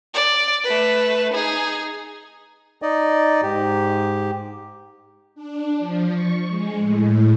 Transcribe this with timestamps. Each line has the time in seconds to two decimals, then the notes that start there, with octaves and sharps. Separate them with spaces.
0.14 D5
0.64 A3 B4
1.33 D#4 G#4
2.82 D#4 D5 D#5
3.43 G#2 G4
5.35 D4
5.79 F3
6.12 C#6
6.47 G#3
6.76 A2